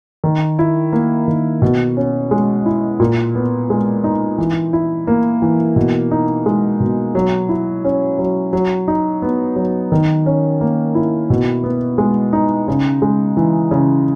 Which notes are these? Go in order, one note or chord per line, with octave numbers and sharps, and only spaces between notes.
D#3
E4
A#3
D#3
B2
C#4
G#3
E4
A#2
B3
G#3
D#4
E3
E4
A#3
E3
B2
D#4
G#3
B2
F#3
E4
C#4
F#3
F#3
D#4
B3
F#3
D#3
C#4
A#3
E4
B2
B3
G#3
D#4
C#3
G#3
E3
C#3